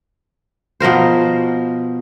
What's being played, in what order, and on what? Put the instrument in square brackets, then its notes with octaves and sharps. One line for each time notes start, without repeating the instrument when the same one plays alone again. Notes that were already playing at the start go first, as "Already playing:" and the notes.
[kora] B2 F3 A#4 C5